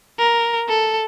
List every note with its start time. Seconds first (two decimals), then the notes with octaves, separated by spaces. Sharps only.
0.18 A#4
0.68 A4